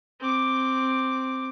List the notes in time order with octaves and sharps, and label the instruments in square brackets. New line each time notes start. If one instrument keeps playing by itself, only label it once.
[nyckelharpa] C4 D6